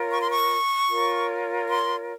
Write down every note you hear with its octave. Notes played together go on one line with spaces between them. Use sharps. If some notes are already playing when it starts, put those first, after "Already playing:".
Already playing: F4 A#4 C#5
C#6
C6
C#6
F4 A#4 C#5
C6